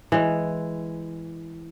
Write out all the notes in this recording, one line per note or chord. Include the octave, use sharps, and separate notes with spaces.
E3 G#3